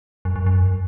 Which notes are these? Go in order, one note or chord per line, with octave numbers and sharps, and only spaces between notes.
F#2
F#2
F#2